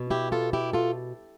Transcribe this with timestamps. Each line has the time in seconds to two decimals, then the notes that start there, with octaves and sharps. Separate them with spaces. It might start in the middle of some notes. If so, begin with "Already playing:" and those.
Already playing: B2
0.10 E4 G4
0.32 F4 A4
0.53 E4 G4
0.73 F4 A4